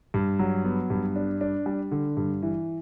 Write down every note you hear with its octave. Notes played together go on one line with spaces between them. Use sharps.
G2
F#3
B3
G2
D4
D4
G3
D3
G2
E3